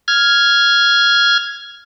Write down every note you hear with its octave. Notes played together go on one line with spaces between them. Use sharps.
F6 G#6